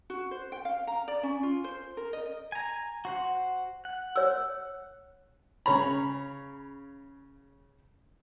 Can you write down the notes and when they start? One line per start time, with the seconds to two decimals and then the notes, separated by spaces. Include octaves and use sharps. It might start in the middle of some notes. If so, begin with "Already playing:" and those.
0.10 F#4
0.31 C5
0.52 G5
0.65 F5
0.87 A#5
1.08 D5
1.23 C#4
1.43 F4
1.64 C5
1.97 A#4
2.13 D#5
2.26 D#5
2.52 G#5 A#5
3.05 F#4 C5 F#5
3.85 F#5
4.16 C#5 E6
5.66 C#3 C#5 A#5 B5